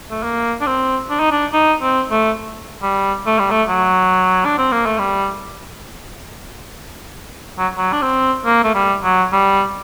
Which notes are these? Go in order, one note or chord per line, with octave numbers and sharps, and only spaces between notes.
A3
A#3
D4
C4
D4
D#4
D4
D#4
C4
A3
G3
A3
G3
A3
F#3
D4
C4
A#3
A3
G3
F#3
F#3
D4
C4
A#3
A3
G3
F#3
G3